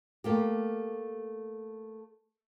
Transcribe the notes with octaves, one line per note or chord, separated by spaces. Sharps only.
A3 A#3 G4